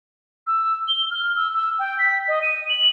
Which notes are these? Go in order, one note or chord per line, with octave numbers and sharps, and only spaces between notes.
E6
G7
F6
E6
E6
G5
B6
D#5
D#7
F#7